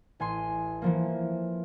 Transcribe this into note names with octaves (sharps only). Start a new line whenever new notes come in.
A1 G#5 C6
E3 F3 A#3